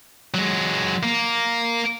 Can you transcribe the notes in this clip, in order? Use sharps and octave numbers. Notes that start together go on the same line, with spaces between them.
F#3 G#3
A#3